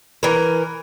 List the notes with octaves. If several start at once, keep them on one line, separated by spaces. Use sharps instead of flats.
E3 A#4